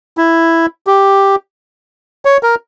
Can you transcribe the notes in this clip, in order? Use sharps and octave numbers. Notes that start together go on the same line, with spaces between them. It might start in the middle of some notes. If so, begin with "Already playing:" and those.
E4
G4
C#5
A#4